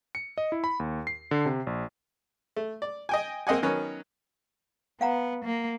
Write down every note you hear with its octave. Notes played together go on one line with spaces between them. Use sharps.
C#7
D#5
E4
B5
D#2
C7
D3
C3
A#1
A3
D5
D#5 G5 G#5
A#3 C4 D#5 F#5 G#5
D#3 F#3 B3 C#4
B3 F5 F#5 A#5
A#3